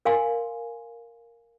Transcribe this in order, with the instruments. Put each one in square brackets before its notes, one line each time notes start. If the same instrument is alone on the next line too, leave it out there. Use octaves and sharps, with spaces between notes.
[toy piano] A#4 F5 G#5 C6